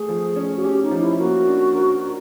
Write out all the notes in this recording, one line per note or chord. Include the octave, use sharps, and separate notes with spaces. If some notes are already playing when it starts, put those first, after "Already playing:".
Already playing: A3 G#4
F3
C#4
F#4
C#4 G4
D#4
F3
E4
A#3 F#4
D4
A#4
A#4